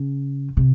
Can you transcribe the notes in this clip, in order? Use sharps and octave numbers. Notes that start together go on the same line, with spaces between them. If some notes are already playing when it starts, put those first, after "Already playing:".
Already playing: C#3
C3